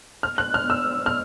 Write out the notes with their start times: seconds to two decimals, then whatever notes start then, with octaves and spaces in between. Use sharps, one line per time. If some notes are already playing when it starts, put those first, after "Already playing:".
0.23 F6
0.38 F#6
0.54 F6
0.70 E6
1.06 F6